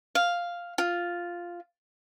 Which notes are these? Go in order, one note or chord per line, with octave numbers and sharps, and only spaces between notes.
F5
F4